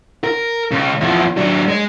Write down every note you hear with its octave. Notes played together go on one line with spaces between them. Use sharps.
A#4
C#2 C#3
E2 F3
F#3 D4
G#3